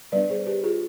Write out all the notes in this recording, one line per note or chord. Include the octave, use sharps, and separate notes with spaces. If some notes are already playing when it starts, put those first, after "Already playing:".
G3 B3 D4 B4 D5
G#4 C5
G4 B4
F4 G#4